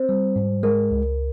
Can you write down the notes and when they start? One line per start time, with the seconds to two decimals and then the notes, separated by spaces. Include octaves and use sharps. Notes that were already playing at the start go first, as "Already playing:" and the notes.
Already playing: C4 C5
0.09 G3
0.36 G#2
0.63 G#3 A#4
0.91 C#2